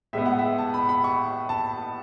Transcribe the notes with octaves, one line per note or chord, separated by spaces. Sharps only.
A2 G#3 B3 E5
F#5
E5
A5
B5
B5
C#6
A5